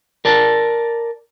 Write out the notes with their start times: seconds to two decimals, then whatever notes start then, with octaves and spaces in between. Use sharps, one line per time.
0.25 A#4 D5 A5